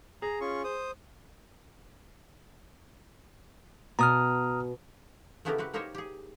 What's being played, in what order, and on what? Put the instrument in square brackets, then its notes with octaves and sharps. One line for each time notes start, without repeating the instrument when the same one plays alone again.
[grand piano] G#4 [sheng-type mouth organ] A#5
[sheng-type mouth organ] C#4 F4 C#6
C5 D#6
[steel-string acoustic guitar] B2 [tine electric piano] A#5 D#6 F6
[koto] C#3 A3 B3 E4 G4 A#4
C4 F#4 G4 B4
A#3 D#4 G4 A#4 C5 C#5
G4 G#4